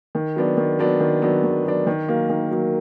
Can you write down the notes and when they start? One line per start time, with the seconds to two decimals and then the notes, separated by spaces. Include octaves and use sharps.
0.15 D#3
0.36 F#3 B3 D4
0.57 D#3
0.79 F#3 B3 D4
1.00 D#3
1.22 F#3 B3 D4
1.43 D#3
1.65 F#3 B3 D4
1.87 D#3
2.08 F#3 A#3
2.29 D#3
2.51 F#3 A#3